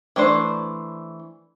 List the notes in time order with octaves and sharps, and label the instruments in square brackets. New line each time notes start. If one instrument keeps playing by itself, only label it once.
[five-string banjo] E3 A3 D4 C5